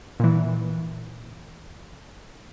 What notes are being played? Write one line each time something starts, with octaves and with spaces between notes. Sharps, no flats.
A#2 E3